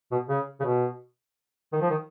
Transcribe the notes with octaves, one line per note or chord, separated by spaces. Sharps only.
B2
C#3
C#3
B2
D#3
F3
D#3